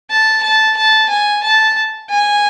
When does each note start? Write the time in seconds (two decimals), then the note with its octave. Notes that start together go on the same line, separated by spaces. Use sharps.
0.11 A5
0.43 A5
0.77 A5
1.10 G#5
1.43 A5
2.10 G#5